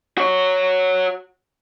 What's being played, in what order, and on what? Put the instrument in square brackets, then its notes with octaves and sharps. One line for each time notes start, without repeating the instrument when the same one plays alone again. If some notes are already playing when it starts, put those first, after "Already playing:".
[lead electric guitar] F#4 C#5